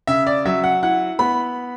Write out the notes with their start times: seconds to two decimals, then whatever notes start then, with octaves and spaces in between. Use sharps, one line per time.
0.07 C#3 E5
0.27 D5
0.45 F#3 E5
0.64 F#5
0.83 E4 F#5
1.19 B3 B5